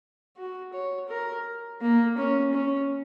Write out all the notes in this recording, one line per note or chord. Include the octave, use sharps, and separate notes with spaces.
F#4
C#5
A#4
A#3
C#4
C#4